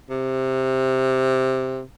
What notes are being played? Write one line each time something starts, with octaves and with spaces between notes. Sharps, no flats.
C3